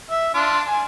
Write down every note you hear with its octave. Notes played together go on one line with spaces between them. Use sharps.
E5
D4 F4
G#5